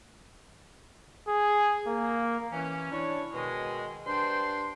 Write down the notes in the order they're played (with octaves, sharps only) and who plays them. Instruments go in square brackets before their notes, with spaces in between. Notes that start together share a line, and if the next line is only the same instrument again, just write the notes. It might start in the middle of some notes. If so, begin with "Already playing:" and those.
[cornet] G#4
A#3
[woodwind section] E3 C#4
D4 E4 C#5
B2 D#3 G#3
G2 D4 C5 G5 C6